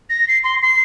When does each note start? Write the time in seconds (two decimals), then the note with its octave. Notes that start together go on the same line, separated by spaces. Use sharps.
0.09 A#6
0.28 C7
0.43 C6
0.62 C7